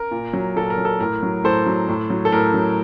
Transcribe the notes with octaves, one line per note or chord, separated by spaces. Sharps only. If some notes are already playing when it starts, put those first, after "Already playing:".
Already playing: A#4
A#2
F#3
A#2 A4
A#4
F#3
A4
A2 A#4
F#3
A2 A4 C5
F#3
A2
F#3
A4
A2 A#4
F#3